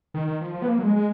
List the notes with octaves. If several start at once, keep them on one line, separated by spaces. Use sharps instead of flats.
D#3
D#3
F3
F3
B3
A#3
F#3
G#3
G#3